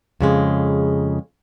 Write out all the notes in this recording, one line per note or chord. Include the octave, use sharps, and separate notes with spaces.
F2 C#3 G#3